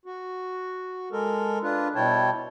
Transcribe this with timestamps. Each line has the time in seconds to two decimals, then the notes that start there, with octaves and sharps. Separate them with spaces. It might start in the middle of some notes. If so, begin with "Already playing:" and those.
0.06 F#4
1.12 G#3 A4 A#4
1.63 D4 F4 B4
1.95 B2 G3 E4 C#5 G5 A5